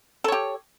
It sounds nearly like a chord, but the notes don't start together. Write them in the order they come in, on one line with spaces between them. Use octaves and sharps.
A4 C#5 G4